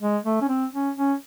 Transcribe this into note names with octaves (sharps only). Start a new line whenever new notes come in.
G#3
A3
C#4
C4
C#4
C#4